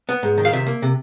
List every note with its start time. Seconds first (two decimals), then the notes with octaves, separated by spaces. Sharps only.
0.09 B3
0.23 G#2
0.38 D#3
0.45 F5
0.53 C3 E5
0.67 A#3
0.82 C3